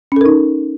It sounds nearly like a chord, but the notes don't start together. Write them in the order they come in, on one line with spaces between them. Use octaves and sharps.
C#4 A4 A#4 D#4